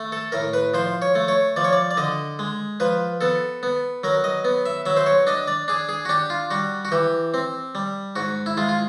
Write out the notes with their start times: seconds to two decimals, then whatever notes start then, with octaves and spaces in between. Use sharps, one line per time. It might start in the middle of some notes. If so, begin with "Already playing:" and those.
Already playing: A3
0.12 A4
0.32 A2 A#4
0.54 B4
0.74 F3 C5
1.02 C#5
1.15 A3
1.28 C#5
1.56 F3 D5
1.64 C#5
1.73 D5
1.91 D5
1.97 D3 D#5
2.39 G#3
2.80 F3 B4
3.21 B3 A4
3.63 B3
4.04 F#3 A#4
4.24 D#5
4.45 B3
4.66 E5
4.86 F#3 E5
4.97 C5
5.06 C#5
5.27 D4 D#5
5.48 D5
5.68 D4 G#4
5.89 G#4
6.05 F#4
6.09 D4 G4
6.30 F4
6.51 G3 F#4
6.85 F#4
6.92 E3 G4
7.34 C4
7.75 G3
8.16 G#2 F#4
8.46 E4
8.57 G#3 F4
8.69 F4